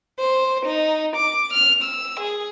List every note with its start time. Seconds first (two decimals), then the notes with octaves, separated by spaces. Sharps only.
0.19 C5
0.65 D#4
1.16 D6
1.53 F6
1.83 E6
2.20 G#4